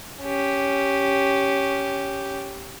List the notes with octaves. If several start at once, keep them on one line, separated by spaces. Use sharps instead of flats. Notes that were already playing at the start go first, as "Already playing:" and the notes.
C#4 G4